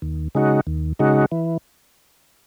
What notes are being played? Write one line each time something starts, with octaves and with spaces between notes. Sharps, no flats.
D#2
C#3 G#3 D#4 F#4
D#2
C#3 G#3 D#4 F#4
E3